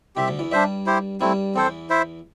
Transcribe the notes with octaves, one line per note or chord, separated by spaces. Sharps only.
C2 C3 C4 G4 E5
D2 D3
E2 E3
G2 G3 D4 C5 E5
E4 G4 C5
G2 G3 A3 C4 E4
E2 E3 C4 A4 C5
E4 C5 E5